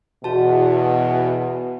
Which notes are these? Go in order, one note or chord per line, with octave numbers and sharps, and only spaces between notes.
E2 B2 F#4 A5